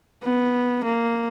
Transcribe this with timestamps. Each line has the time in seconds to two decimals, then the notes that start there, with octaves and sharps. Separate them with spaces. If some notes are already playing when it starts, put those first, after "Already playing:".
0.24 B3
0.84 A#3